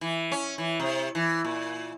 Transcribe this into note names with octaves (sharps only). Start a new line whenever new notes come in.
E3
C#4
E3
C3
E3
A#2